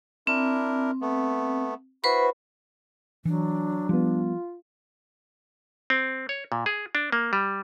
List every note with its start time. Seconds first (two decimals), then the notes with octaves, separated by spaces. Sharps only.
0.27 C4 D4 E4 A#4
1.01 A3 B3
2.04 E4 F#4 B4 C5 B5
3.25 E3 F#3 D4
3.89 F3 G3 B3 F4
5.90 C4
6.29 C#5
6.52 A#2
6.66 G#4
6.95 D4
7.12 A#3
7.33 G3